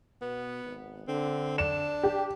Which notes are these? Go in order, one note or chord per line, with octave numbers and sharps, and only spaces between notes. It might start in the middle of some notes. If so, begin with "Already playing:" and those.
B2 B3
G#1
D3 C4
D4 E7
G4